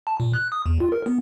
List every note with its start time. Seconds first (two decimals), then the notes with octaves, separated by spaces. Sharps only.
0.07 A5
0.20 A#2
0.33 F#6
0.52 D#6
0.66 E2
0.80 F4
0.92 A#4
1.06 B3